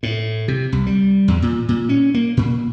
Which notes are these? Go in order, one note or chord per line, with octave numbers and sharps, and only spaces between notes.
A2
C3
C2
G3
E2
A#2
A#2
C#4
A#3
A#2